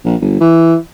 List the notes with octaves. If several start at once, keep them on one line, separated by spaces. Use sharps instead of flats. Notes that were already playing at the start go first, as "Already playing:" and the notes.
A#1
G1
E3